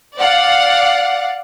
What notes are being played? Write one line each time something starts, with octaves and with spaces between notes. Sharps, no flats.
D5 F5 F#5